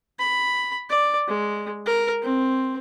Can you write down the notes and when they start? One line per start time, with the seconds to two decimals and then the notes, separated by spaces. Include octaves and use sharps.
0.19 B5
0.89 D5
1.28 G#3
1.86 A#4
2.22 C4